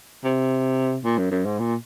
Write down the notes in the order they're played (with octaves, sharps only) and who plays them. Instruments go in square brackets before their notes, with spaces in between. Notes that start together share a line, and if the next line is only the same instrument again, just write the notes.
[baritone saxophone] C3
A#2
F#2
F#2
G#2
A#2